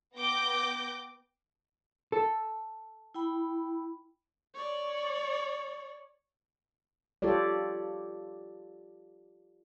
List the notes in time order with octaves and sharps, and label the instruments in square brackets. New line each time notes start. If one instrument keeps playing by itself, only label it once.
[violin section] B3 G5 D6 G6 A#6
[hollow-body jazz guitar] A4
[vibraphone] E4 G5 B5
[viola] C#5 D5
[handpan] F4 G4 A4 C#5 D5